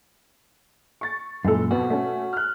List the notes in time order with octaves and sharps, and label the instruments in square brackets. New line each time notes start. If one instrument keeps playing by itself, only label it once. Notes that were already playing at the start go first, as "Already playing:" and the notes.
[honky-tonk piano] C#6 A6
[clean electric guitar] F#2 A#2 [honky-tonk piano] E3 G#3 A4
[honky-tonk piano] F2 B2 B3 [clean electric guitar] F#4
[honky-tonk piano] A3 C#4
F6 F#6